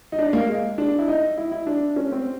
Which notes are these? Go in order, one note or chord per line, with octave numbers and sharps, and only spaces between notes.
D#4
D4
A#3
G#3
D4
E4
D#4
E4
E4
D4
C#4
C4